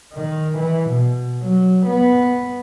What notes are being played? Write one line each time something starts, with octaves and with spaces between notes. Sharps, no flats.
D#3
E3
B2
F#3
B3